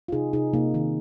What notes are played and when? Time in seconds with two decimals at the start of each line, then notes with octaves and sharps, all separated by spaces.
0.08 F4
0.12 C3 D#4 G#4
0.33 C3 D#4 G#4
0.53 C3 A#3 D#4
0.74 D#3